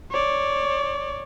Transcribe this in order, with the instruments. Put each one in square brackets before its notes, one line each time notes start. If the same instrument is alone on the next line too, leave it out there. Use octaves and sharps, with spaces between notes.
[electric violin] C#5 D5